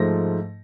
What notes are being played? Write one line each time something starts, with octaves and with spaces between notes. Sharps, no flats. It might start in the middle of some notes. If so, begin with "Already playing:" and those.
Already playing: G#2 F3 A3 A#6